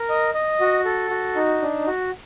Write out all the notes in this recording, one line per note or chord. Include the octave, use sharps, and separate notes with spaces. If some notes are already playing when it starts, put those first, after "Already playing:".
Already playing: A#4
D#5
D#5
F#4
A4
F#4
D#4
D4
F#4